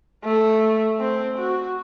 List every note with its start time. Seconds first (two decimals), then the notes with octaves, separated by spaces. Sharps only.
0.25 A3
1.00 C4
1.39 F#4